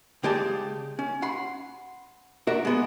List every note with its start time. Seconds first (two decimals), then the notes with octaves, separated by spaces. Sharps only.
0.24 C#3 G#3 G4 G#4 D5 A5
0.99 C#4
1.22 F#5 B5 C6
2.47 D4 F#4 A#4 E5
2.65 G#3 B3